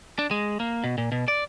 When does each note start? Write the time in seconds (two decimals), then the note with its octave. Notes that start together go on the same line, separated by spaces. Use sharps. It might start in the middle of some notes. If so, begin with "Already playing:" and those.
0.19 D4
0.31 G#3
0.60 A#3
0.84 B2
0.98 A#2
1.12 B2
1.28 D5